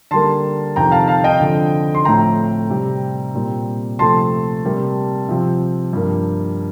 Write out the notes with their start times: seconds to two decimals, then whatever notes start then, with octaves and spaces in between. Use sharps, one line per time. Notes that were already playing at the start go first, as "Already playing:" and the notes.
0.11 D3 G3 A#3 A5 C6
0.76 F2 C3 D#3 G5 A#5
0.91 F5 A5
1.08 F5 A5
1.24 D#5 G5
1.40 D3 F3 C4
1.95 C6
2.05 A2 F3 C4 G5 A#5
2.70 C3 G3 C4
3.35 A#2 G3 C4
3.99 C3 F3 A3 C4 A5 C6
4.64 C3 G3 A#3
5.29 C3 F3 C4
5.93 G2 F3 A#3